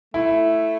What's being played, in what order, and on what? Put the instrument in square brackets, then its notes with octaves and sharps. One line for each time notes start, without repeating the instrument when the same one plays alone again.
[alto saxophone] A3 [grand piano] E4